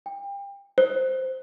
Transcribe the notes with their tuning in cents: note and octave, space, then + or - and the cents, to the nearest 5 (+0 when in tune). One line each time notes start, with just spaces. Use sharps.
G5 +30
C5 -5